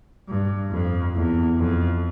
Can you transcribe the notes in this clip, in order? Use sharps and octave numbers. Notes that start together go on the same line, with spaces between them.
G2
F2
E2
F2